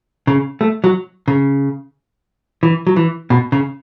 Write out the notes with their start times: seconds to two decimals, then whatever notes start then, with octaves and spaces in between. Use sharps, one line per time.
0.27 C#3
0.61 A3
0.84 F#3
1.28 C#3
2.63 E3
2.87 F#3
2.96 E3
3.30 B2
3.52 C#3